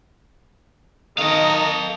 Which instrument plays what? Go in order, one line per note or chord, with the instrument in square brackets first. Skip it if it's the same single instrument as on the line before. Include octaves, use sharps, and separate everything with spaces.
[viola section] D#3 D#5 A#5 [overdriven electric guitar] A4 F5